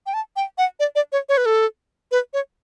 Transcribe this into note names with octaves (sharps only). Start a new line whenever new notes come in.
G5
A5
G5
F#5
D5
D5
C#5
C#5
B4
A4
B4
C#5